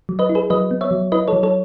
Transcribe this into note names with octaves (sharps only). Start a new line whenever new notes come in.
F#3
B4 D#5
E4
G#4 B4
F#3 B4 D#5
B3
C#5 E5
F#3
E4 B4 D#5
A4 C#5
F#3
A4 C#5